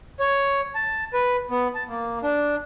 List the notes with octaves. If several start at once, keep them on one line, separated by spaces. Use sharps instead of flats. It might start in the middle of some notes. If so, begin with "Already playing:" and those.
C#5
A5
B4
B3
A5
A#3
D4